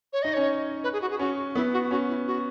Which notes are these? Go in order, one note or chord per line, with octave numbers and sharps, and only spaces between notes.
C#5
D#4 D#5
C#4 C#5
B4
G#4
F#4
G#4
C#4 F#4
B3 E4
F#4
C#4 F#4
E4
F#4